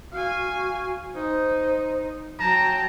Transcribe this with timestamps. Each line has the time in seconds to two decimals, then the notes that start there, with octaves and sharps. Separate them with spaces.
0.12 F#4 F5 G#5
1.15 D#4 C5
2.39 F#3 G5 A5 A#5